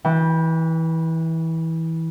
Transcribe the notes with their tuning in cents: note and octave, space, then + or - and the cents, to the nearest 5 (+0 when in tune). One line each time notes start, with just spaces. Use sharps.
E3 -20 G5 +20